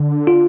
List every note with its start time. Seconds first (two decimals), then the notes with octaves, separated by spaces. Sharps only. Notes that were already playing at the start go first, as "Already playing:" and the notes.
Already playing: D3
0.27 F4